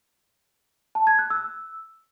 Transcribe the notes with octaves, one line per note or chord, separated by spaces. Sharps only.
A5
G#6
F#6
E6